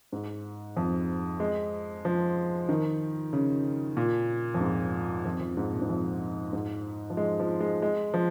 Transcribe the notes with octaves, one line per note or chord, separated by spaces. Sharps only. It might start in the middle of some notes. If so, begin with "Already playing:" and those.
G#2
F2
G#3
F3
D#3
C#3
A#2
F2
G#2
F2
F2
G#2
A#2
G#2
F2
G#2
F3
G#3
F3
G#3
G#3
F3